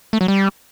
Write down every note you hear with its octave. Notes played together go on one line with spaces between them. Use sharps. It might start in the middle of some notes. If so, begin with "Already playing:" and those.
A3
F#3
G3